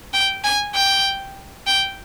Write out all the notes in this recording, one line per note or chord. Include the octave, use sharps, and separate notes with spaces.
G5
G#5
G5
G5